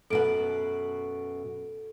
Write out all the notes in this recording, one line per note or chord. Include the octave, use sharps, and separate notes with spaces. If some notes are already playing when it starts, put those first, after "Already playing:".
F#2 B2 A4 F#5 D7